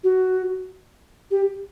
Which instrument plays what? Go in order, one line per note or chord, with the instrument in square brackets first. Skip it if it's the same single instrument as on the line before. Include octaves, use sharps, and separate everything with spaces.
[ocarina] F#4
G4